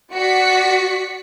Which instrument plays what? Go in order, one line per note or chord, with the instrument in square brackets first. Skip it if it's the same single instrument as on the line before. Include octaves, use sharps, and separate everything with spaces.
[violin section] F#4 D5 B6 C#7